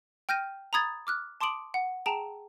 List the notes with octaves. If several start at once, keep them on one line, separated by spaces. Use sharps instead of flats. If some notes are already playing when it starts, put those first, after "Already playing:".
G5 F6 G6 A#6 D#7
A#5 B5 D#6 G#6 A6
D6 F6 F#6
A5 C6 D6 D#6 D7 F#7
F#5
G#4 G5 A5 A#5 D7 E7